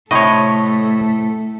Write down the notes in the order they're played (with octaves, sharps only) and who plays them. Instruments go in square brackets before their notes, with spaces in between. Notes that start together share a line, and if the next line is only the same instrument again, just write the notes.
[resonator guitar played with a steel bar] A2 C3 [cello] A3 [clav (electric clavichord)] C#5 D#5